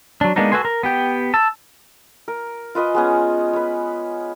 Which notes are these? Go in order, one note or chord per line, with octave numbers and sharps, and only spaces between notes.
F#3 D4
G#3 A#3 B3 D4 D#4
F#4 A4 B4 G#5 C6
A#4
B3 G4 G5
A5 E6
A#4
F4 B4 D#5 G#5
G#3 B3 C#4
B4 C#5